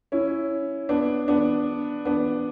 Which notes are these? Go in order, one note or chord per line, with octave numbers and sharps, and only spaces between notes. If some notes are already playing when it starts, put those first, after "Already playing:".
C#4 E4
B3 D4
B3 D4
B3 D4